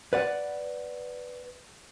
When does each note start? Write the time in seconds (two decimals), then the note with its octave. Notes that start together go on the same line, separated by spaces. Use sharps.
0.13 B4 D5 F#5